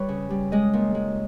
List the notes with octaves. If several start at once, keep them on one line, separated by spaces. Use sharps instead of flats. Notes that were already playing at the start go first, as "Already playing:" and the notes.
Already playing: G3 B4 C#5
C#3
G3
G#3 D#5
A#2
G#3